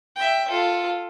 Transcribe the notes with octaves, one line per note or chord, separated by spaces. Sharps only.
E5 G5
F4 A4